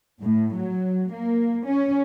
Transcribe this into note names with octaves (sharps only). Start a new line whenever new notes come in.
A2
F#3
A#3
C#4